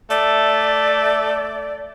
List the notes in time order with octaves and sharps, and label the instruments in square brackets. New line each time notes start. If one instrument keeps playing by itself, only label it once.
[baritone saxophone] A3 [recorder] D5